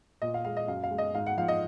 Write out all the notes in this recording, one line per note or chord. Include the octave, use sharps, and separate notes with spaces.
A#2 D#5
F5
G#3 F5
D#5
F#2 F5
F5
G#3
D#5
G#2 F5
F#5
F3 F5
D#5